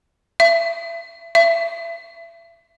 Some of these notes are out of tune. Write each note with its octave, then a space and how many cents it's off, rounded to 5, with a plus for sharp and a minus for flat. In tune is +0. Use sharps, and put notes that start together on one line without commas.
E5 +30
E5 +30